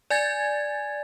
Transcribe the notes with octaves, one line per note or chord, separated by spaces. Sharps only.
D5 G#5 G#6 A6